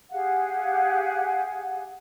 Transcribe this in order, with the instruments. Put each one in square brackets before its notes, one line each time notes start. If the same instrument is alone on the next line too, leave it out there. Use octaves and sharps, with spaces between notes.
[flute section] G4 G#4 F5 F#5